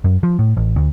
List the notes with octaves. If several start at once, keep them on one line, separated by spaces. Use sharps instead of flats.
F#2
F3
A2
A1
D2